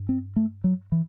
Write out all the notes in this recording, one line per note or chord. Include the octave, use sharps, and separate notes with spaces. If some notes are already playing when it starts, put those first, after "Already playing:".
Already playing: G2
C4
A3
F#3
E3